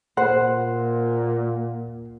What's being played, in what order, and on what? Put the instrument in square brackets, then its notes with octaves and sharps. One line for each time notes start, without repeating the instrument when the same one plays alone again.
[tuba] A#2 [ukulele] C5 [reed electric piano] F#5